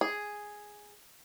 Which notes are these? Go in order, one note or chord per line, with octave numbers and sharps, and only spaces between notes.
G#4